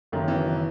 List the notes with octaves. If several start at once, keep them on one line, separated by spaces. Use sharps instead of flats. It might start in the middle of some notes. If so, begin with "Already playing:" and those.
F#1 F#2 D#3
E3